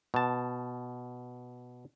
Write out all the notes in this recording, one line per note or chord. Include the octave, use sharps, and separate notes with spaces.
B2 A5